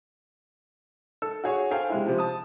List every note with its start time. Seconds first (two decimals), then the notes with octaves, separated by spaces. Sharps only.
1.22 A4 E6
1.44 F#4 G#4 C#5
1.71 A4 C5 F5 G5 G#5
1.90 C3 G#3 E4
2.06 C3 F3
2.18 A5 D#6